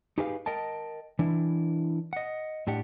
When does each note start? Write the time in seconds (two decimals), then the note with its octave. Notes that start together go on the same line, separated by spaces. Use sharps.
0.18 D#4 G4 G#4 B4 D#5 F5
0.46 A#4 D#5 G5 A5
1.19 E3 D4 E4
2.13 D#5 F#5
2.67 A2 D4 G4 F#5